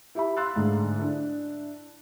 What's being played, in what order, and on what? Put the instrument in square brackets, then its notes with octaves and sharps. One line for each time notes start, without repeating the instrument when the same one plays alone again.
[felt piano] E4 G4 E5 B5
F5 C6 E6 F#6 A6
G#2 D3 A3
D4 E4